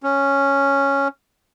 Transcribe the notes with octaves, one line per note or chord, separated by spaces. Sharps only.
C#4